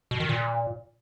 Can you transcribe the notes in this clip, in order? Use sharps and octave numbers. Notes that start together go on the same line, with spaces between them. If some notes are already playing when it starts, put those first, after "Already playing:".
B2
D#3
A#2